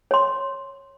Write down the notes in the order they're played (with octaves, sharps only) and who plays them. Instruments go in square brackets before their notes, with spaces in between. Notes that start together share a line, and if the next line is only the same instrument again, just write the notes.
[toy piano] C#5 C6